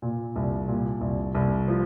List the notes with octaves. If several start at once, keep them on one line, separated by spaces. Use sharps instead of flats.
A#2
C2
A#2
C2
C2
F3